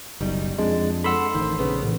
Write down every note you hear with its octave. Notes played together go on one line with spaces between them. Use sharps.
F#1 B1 B2 G3 D#4
F2 G#3 D4
A4 F#5 B5 C6 E6
A1 D#3 C5
A#1 C#3 B3
A1